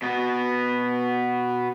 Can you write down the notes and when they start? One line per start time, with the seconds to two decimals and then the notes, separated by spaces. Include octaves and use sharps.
0.02 B2 B3